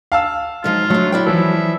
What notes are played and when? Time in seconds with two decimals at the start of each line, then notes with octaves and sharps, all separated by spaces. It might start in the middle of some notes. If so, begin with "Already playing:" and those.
0.12 F5 A5 E6
0.64 G#2 F3 F#3 F4
0.90 D3 F#3 A3
1.12 E4 D5 G5
1.27 E3 F3 E5